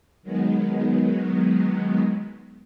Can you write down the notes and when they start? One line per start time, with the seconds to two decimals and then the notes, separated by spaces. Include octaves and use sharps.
0.23 D#3 F#3 G#3 B3